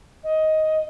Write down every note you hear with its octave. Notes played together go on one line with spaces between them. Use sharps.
D#5